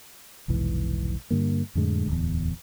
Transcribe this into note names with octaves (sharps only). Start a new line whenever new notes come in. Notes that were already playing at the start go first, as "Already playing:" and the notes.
F1 B1 G#2 E3
G2 D3 A#3
F2 A2 D3 G#3
D1 E2